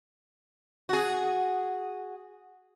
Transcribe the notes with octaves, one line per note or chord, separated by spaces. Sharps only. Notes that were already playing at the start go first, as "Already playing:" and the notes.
F#4 G#4